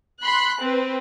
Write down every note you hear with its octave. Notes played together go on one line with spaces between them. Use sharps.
B5 C6 F#6
C4 B4